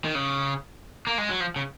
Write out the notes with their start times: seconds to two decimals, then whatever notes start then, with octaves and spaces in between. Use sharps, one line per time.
0.04 D#3
0.15 C#3
1.07 A#3
1.18 G#3
1.29 F#3
1.40 F3
1.56 C#3